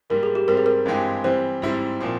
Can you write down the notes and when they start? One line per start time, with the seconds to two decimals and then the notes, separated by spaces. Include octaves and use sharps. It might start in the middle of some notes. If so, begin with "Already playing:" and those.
0.10 G#2 G3 A#3 A#4
0.23 G#4
0.35 G4
0.48 G#2 G3 C4 A#4
0.57 G#4
0.66 A#4
0.86 G2 E3 G#3 C4 G4
1.24 E3 G3 C4 C5
1.62 G#2 G3 C4 E4
2.00 A#2 F3 C4